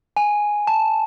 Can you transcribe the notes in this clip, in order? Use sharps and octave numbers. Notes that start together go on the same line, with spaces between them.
G#5
A5